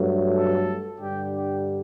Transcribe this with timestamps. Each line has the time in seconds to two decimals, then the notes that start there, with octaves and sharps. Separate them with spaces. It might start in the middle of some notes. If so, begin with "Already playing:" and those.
Already playing: G2 F#3 A3
0.35 A4
1.01 G2 D3 G3 G4
1.33 G4